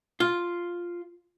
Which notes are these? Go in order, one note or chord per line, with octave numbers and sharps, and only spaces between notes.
F4